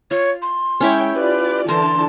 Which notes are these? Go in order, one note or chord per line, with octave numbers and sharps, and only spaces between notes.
F4 C#5
C6
G#3 C#4 E4 C#5 E5 G5
F4 G4 B4 D5
D3 E3 A#4 A5 C6